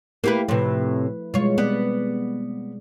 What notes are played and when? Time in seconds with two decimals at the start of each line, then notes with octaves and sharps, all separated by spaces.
0.24 A3 A#3 E4 G4 B4
0.48 A2 C3 F3 B4
1.34 B2 G3 G#3 F4 C#5
1.58 B3 C4 D5